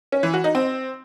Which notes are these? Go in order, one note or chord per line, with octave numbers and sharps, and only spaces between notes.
C#4
E3
F#4
D#4
C4